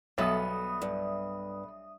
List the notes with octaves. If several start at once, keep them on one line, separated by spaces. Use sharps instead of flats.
B1 G3 B3 A4 E5 D#6
G2